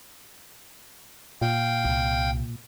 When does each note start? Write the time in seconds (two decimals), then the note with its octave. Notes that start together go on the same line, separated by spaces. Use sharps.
1.42 A#2 F5 G5
1.85 C2